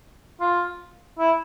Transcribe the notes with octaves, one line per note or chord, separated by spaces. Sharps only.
F4
E4